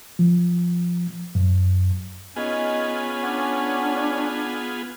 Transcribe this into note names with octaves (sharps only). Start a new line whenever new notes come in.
F3
F#2
B3 C#4 D#4 F4 G#4 G#5
D4 D5 F#5 G#5